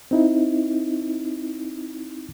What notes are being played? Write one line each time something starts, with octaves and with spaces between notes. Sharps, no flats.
C4 D#4 E4